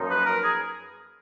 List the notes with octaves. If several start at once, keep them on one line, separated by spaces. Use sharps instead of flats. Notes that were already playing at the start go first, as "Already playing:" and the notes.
Already playing: F#2 F3 A#3 D#4
B4
A#4
G#4